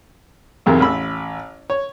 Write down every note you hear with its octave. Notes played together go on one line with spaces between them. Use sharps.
B1 E2 C3 A#4
A1 B5 E6
C#5